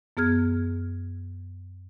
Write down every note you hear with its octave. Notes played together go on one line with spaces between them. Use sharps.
F#2 B3 G#4 F6 G#6